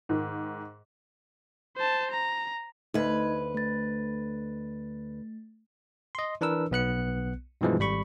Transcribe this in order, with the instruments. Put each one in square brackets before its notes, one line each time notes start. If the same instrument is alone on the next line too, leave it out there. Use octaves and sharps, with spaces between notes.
[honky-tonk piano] G#2 D#3
[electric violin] C5 A5
A#5
[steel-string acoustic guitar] D2 B4 [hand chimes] D#4 D#5 G#6
[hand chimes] A3 A6
[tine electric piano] D#5 C6
E3 D4 A#4 B4 E6
B1 B3 F#6 C#7
G2 B2 E3 F3 G#3
G#1 G3 B5 C#6